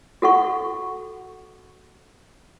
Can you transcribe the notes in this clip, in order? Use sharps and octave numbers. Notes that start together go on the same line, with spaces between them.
F#4 A4 F#5 C#6